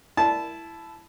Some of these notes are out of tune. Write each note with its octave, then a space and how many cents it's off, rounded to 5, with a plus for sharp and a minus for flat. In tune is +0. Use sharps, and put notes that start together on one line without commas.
E4 +10 A5 -15